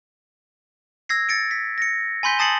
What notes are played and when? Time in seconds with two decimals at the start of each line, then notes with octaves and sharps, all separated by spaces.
1.09 E6 G#6 A#6 C7
1.29 A6 C#7 D7
1.51 B6
1.78 A#6 C#7
2.23 G#5 B5 C6 G6 B6 G7
2.39 A5 D#6 A6 C7 C#7 F#7